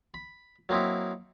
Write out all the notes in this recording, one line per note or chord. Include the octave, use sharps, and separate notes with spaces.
B5
F#3 A#3 C4 D#4 E4